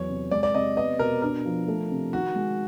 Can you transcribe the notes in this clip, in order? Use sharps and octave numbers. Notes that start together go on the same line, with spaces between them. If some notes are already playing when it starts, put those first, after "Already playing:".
Already playing: E2 F#3 C#5
C3
G#3 D5
D5
C3 D#5
B3 D#5
B2 A#4
D4 A#4
F3
A3
C3
D#3 F#4
G#3